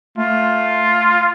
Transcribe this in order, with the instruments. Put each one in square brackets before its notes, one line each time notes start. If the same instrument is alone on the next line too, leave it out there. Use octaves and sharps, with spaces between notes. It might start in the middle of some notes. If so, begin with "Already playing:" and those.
[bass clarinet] A3 [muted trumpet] F4